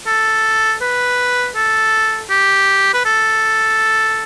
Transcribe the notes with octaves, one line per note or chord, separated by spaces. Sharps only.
A4
B4
A4
G4
B4
A4